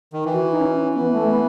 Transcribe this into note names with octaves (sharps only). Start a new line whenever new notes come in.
D#3
E3
F#4
D#4
C#4
E3 B3
A3
B3